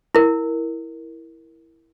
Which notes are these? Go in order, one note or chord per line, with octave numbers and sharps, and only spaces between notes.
E4 A#4